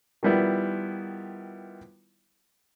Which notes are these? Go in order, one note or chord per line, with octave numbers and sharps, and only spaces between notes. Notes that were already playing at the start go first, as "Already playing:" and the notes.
D#3 F3 G3 B3 E4